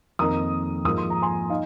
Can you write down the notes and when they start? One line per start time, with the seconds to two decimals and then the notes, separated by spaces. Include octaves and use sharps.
0.19 F2 D#3 A#3 D#4 A#5 D#6
0.85 G#2 F3 A#3 D#6
0.98 C6
1.10 A#5
1.22 G#5 C6
1.50 D#4 F5